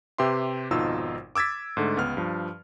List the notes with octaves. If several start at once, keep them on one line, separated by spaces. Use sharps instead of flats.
C3 G4 B4 E5 C6
G#1 F2 B2 D#4 F4 E6
D6 E6 G#6 A6 B6
G#2 D3 A3
C#2 B3 F6
G2 F3